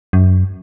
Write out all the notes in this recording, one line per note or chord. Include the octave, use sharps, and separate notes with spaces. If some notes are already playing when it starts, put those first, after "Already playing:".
F#2